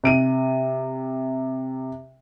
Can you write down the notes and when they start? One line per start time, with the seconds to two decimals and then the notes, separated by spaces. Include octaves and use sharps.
0.04 C3 D7 D#7